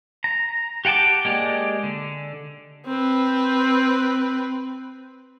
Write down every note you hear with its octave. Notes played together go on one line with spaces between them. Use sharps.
A#5
G4 F#5 G5 A5 D6
G#3 A#3 G4 D5
D3
C4 B4